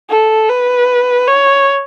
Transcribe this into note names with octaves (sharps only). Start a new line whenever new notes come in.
A4
B4
C#5